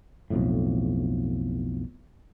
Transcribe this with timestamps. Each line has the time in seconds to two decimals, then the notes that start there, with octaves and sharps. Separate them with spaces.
0.30 B1 F2 A2